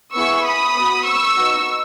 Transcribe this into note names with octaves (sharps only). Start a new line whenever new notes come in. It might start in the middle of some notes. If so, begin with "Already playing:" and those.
B3 E4 G#4 C#6 E6
B5 D#6
B3 F#4
C#6 E6
B3 D#4 F#4